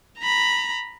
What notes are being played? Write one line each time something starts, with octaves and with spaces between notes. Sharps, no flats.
A#5 B5